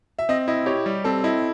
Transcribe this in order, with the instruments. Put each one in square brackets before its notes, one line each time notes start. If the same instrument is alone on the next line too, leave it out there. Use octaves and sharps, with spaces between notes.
[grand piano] E5
[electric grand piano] C4 [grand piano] D#5
[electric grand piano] E4 [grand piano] D#5
[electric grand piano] G4 [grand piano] C#5
[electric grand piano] G3
[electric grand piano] C4 [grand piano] A4
[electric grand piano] E4 [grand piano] D#5